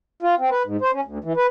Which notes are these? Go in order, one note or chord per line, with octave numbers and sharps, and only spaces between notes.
F4
C4
B4
G#2
C5
C#4
D2
E3
B4